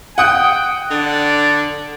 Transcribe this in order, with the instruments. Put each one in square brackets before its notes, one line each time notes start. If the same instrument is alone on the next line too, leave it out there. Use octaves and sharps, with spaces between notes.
[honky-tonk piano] F#5 D#6 F#6 [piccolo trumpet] G5
[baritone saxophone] D3 [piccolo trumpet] D5